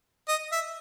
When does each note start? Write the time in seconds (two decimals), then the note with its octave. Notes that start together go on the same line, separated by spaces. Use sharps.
0.28 D#5
0.52 E5